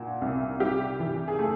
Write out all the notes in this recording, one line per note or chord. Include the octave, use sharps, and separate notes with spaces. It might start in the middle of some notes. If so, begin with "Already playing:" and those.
Already playing: A#2 F4 F#4
C2
G3 G4
E3
G#4
C#3 A3 A4